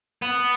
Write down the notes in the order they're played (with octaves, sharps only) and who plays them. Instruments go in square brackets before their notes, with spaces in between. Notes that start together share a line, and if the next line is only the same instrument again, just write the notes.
[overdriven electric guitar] B3